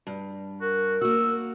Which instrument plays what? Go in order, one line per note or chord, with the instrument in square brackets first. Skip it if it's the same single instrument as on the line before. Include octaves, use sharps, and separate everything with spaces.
[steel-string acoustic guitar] G2
[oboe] F#4 [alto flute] A#4
[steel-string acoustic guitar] A#3 F#4 [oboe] E6